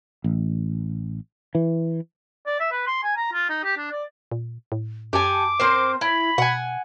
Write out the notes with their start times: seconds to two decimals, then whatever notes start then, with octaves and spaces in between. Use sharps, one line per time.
0.24 A1
1.55 E3
2.46 D5
2.59 E5
2.71 B4
2.87 C6
3.03 G#5
3.16 A#5
3.33 F4
3.49 D#4
3.64 G4
3.77 D4
3.91 D5
4.32 A#2
4.72 A2
5.13 F#2 G4 A4 G#5 D6
5.59 C4 A#4 C5
6.01 E4 B5
6.38 B2 F#5 G#5